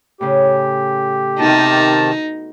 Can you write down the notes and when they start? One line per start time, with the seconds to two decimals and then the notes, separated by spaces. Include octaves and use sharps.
0.21 A2 C#3 G4
1.39 C3 D#3 B3 D#4 F#4 A5